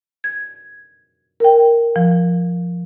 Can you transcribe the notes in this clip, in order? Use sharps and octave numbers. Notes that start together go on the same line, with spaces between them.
G#6
A#4 G5
F3